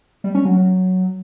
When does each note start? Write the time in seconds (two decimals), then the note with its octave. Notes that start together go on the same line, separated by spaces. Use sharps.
0.24 G3
0.35 C#4
0.45 F#3
0.56 F#3